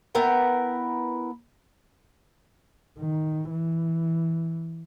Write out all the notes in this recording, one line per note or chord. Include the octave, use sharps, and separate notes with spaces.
B3 E4 A#4 G5
D#3
E3